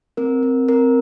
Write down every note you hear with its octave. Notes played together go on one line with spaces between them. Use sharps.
C4 A#4
C4
C4 A#4